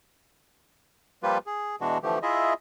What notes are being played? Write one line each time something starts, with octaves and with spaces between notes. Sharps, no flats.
F3 G3 A#3 F4 G4 B4
G#4
B2 E3 G#3 D4 F#4
D3 E3 F3 A3 G4
E4 F4 G#4 D#5 E5